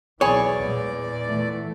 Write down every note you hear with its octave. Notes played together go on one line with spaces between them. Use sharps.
B1 E2 E3 G#4 C#5 D5 G#5 B5
A#2 G#3
A#2 E3 A3